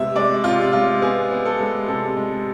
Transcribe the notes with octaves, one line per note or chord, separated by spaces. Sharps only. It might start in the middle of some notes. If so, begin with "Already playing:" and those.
Already playing: C3 G#3 B3 E5
G#3 D5
C3 F4
G#3 F4
B3 G#4
B3
A4
G#3
C3 A4
G#3